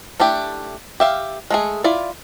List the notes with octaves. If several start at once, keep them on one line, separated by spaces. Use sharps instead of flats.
A3 D4 E4 G4
G4 E5 F5
G#3 A3 G#4
E4 F4 D5